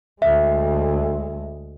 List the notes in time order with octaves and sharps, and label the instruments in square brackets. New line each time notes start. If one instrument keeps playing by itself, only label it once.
[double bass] D2 G#3 [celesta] E5